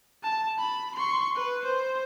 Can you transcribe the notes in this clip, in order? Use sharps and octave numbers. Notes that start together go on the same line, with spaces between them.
A5
B5
C6 C#6
B4
C5